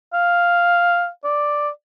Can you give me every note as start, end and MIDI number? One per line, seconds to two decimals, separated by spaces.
0.13 1.08 77
1.24 1.69 74